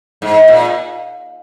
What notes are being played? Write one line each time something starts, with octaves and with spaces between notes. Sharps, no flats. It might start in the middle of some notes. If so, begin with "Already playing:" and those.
G#2
A#2